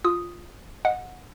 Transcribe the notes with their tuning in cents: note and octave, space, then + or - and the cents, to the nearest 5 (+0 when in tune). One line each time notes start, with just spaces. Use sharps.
F4 +0 D#6 +0
D#5 +0 F#5 -20